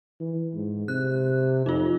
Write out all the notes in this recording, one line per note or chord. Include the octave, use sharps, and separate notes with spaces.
E3
G#2
C3 F#6
F2 D#4 F4